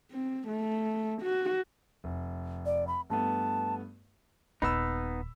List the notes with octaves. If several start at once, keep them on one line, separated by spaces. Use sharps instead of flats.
C4
A3
F#4
F1
D5
B5
G2 A3 B3 A5
D#1 D#2 B3 D#4 B5 E6